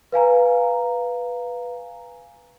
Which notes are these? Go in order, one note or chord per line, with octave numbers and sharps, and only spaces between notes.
B4 F5 G#5 A#5